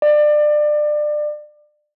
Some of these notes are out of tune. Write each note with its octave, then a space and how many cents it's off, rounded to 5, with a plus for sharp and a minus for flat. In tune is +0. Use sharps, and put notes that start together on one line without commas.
D5 +25